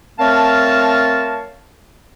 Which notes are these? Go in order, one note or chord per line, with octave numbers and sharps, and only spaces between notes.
A3 C4 A#4 C#5 F5 A5